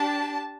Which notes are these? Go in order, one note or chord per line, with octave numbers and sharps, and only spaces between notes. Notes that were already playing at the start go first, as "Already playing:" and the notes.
Already playing: D4 G4 A5